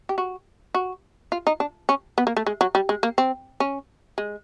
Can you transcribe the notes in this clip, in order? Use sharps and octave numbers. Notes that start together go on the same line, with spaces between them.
G4
F#4
F#4
F4
D#4
D4
C#4
B3
A#3
A3
G#3
F#3
G3
G#3
A#3
C4
C#4
G#3